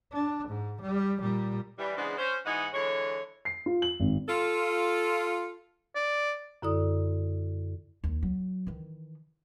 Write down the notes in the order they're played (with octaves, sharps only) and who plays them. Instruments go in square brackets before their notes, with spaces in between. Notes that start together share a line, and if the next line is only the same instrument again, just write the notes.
[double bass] D4
G#2
G3
A#2 G3
[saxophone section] E3 G3
C#3 E3 G#3 B3 D4 C5
C#4 C5
G#2 E3 D#4 G#4 F#5
D3 E3 G#3 C#5
[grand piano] C7
F4
F#7
G#1
[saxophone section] F4 A4
[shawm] D5
[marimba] F#2 D3 E4 A4 D5 D#6
[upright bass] D#2
F#3
D#3 E3